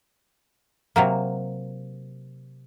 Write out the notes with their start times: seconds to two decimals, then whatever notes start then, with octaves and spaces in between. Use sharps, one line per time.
0.96 C3 F#3 A#3